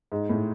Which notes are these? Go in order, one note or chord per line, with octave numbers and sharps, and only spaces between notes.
G#2
A2